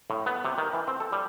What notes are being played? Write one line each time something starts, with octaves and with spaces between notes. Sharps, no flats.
A2
B3
C3
D#3
E3
C4
A4
G3